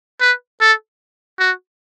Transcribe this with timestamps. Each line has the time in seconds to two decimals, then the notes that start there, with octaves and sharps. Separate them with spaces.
0.20 B4
0.60 A4
1.39 F#4